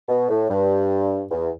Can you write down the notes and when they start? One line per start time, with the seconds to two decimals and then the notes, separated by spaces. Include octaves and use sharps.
0.09 B2
0.29 A2
0.49 G2
1.30 E2